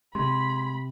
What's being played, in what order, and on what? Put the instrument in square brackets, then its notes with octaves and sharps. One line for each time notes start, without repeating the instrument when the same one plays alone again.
[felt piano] C3 [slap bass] G#3 [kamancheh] B5 [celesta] C6